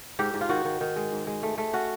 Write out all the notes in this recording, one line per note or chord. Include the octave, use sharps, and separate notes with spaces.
G#2 G4
G#2
F4
D#3 F#4
D#3
D#3
G#3
G#2
G#3
A3
A3
C#4 F#4